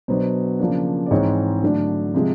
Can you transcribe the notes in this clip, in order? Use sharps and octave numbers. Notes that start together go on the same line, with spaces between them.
B2 F#3 B3 D4 C5
C#3 F3 A#3 D4
D5
G#2 E3 G#3 C4 D#4 C#5
D3 F#3 A3 D4
C3 F3 G#3